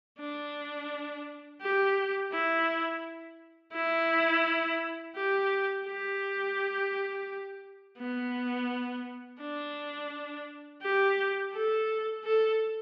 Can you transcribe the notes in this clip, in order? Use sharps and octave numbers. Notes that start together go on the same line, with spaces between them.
D4
G4
E4
E4
G4
G4
B3
D4
G4
A4
A4